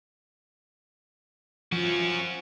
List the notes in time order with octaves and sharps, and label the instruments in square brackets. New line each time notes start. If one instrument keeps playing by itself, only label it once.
[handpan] F3 [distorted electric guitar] C#4 F#4